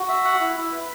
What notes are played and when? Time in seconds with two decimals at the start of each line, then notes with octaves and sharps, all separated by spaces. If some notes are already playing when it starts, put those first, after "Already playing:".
Already playing: F#4
0.09 E5
0.25 F#5
0.41 E4
0.57 E4
0.72 B4